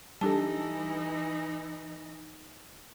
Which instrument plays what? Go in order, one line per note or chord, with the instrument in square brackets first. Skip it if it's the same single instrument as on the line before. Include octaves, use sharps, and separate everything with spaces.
[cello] E3 D#4 [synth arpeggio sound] G3 D4 A4 [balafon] G4 A5